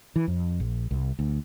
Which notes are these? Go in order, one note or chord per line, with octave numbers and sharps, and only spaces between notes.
E3
F2
A#1
C2
D2